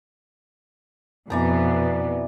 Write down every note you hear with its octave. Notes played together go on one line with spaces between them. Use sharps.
F2 B2 E3 B3 D5 A#5